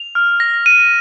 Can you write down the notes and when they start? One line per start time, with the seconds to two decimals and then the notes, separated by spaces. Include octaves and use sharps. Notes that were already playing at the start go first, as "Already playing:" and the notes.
Already playing: F7
0.15 F6
0.40 A#6
0.66 D#7